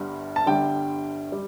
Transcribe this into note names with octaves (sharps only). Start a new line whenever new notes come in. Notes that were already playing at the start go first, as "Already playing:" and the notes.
Already playing: G1 G2 D3 G3
A5
G1 G2 D3 G3 G5
G3